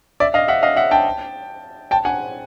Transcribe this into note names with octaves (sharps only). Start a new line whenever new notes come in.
D5 E5
D#5 F5
E5 F#5
D#5 F5
E5 F#5
G5 A5
G5 A5
F#5 G#5